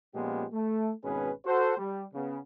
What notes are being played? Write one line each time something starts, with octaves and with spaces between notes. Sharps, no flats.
A#2 F3 G#3 B3 C#4 G4
A3
G#1 B2 C#4 G#4 B4
F#4 A4 C5
G3
C#3 B3